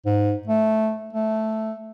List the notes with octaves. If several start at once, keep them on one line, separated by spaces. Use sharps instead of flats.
G#2
A3
A3